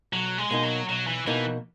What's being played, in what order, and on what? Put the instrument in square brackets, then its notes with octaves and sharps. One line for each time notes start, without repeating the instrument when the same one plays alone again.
[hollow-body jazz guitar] B1 [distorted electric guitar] F#3
[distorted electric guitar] G#3
[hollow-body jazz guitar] B2 A#3 D#4
[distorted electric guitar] F#3
[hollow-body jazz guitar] B1 [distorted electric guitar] F#3
[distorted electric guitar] E3
[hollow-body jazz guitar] B2 A#3 D#4 [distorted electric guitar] E3